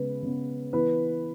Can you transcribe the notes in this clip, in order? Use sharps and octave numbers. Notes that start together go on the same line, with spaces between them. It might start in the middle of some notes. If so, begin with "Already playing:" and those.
Already playing: C#3 G#3 B3 B4
C#3 G#3 B3
E3 B3 B4